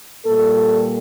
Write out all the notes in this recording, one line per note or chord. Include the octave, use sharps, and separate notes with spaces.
A#2 G3 A#3 A4